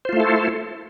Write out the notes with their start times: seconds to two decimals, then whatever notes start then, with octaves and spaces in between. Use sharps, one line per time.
0.05 C5
0.09 F4
0.13 A3
0.16 E4
0.20 A4